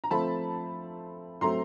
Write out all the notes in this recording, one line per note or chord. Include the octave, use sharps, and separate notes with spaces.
A#5
F3 A3 C4 A5 B5
F#3 A3 C4 A#5 C6